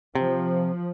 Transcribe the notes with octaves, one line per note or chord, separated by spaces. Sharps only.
C3 F3